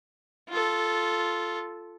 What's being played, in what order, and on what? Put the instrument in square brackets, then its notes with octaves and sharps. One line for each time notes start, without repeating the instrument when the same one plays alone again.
[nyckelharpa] F4 A4